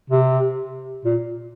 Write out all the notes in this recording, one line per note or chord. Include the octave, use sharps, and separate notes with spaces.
C3
A#2